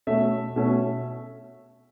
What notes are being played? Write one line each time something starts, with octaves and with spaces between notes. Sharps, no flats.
B2 A3 C#4 E5
B2 A3 C#4